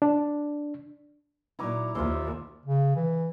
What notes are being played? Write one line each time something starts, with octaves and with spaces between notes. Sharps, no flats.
D4
A#2 F#3 D#4 E4 A#5 D6
D#2 F4 C5 D5 E5
C#3
E3